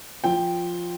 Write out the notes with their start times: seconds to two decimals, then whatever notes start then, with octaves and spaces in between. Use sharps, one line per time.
0.24 F3 G5